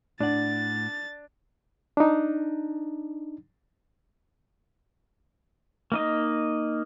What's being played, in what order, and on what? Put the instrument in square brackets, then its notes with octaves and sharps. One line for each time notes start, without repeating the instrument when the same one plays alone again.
[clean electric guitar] A2 F#5 [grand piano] D4 [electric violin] A6
[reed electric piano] D4 D#4
[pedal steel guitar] A#3 D#4 D#5